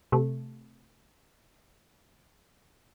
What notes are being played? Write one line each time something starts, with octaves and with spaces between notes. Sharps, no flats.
C3 A3